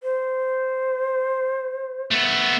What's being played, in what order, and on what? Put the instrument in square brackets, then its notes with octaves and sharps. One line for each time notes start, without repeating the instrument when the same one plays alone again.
[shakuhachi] C5
[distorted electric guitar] A3 B3